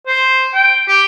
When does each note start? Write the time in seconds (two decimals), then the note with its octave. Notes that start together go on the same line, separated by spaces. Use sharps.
0.07 C5
0.54 G5
0.88 G4